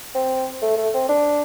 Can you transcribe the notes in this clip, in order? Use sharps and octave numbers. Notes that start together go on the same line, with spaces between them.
C4
A3
A3
C4
D4